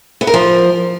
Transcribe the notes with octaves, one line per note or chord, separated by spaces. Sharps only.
B3
A#4
F3